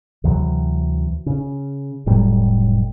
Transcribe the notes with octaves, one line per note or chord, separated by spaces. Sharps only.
D2 C3 E3 F#3
C#3
F1 A2 F#3 G3